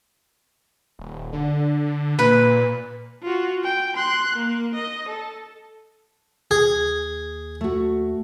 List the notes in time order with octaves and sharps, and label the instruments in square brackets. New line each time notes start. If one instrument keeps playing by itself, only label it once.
[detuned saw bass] D#1
D3
[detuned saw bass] A#2 [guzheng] B4
[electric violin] F4 F#4
G5
C6 F#6
A#3
D#5
A4
[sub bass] D#2 [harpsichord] G#4
[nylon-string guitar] A3 F#4